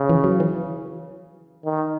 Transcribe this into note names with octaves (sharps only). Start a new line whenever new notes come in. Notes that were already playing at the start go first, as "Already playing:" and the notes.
Already playing: C#3
E3
F#3
E3
D#3